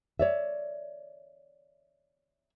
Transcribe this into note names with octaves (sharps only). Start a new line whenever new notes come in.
C#5 D5 E5